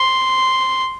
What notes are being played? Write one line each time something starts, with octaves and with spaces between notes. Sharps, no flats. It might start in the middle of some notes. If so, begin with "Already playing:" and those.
Already playing: C6